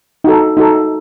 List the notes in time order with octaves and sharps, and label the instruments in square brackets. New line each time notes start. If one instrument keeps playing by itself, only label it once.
[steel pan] D#4 F#4 A4
D#4 F#4 A4